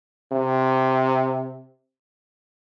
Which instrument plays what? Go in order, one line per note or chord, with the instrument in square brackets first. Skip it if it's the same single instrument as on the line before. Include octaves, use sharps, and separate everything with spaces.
[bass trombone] C3